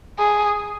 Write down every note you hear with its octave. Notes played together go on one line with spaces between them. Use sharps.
G#4